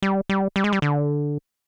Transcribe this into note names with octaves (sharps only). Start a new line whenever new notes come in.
G3
G3
G3
G#3
G3
D3